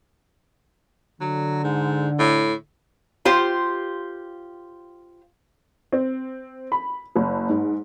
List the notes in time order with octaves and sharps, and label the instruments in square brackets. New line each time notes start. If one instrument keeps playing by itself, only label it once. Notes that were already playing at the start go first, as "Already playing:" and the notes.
[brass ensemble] D3 [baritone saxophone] F#3
[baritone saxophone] G#2
A2
[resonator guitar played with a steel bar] F4 G4 C5
[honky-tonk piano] C4
B5
F#1
G#2